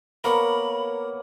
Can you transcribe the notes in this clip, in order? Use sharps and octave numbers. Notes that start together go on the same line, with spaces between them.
A#3 B3 A#4 C#5 B5